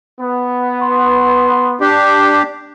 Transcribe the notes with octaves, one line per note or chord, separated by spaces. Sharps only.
B3
C6
D4 G4 D5